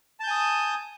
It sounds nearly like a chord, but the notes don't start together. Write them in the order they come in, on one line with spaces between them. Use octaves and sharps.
A5 G6 G#5 D#6